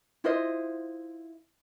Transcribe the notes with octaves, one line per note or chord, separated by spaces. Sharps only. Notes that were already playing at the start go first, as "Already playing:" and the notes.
E4 F4 C5 D#5